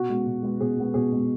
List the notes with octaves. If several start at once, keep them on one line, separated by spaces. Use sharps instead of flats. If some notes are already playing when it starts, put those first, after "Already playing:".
Already playing: B2 F#4
G#3 B3
B2
G#3 B3
B2 G#4
G#3 B3
B2 G#4
G#3 B3